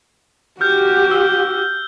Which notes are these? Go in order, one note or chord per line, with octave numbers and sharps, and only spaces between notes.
F#4 G4 F6 G6
E6